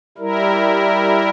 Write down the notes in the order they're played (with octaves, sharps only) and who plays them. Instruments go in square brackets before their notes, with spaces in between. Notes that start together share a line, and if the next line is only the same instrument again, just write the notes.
[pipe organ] G3 E4 A#4